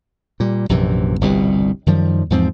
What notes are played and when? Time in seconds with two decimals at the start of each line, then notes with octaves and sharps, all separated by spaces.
0.40 A#2 G3
0.69 A#1 F#2 C3 E3
1.21 G1 C2 B2 G3
1.86 F#2 D#3 F3 G3
2.30 E2 G#2 F3 C4